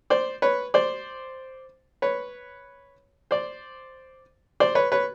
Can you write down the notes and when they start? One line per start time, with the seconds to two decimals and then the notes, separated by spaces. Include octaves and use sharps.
0.10 C5 D5
0.42 B4 C#5
0.74 C5 D5
2.02 B4 C#5
3.31 C5 D5
4.60 C5 D5
4.75 B4 C#5
4.92 B4 C#5